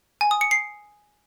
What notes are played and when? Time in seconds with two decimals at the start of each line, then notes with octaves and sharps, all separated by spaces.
0.21 G#5
0.31 D#6
0.41 C#7
0.51 C7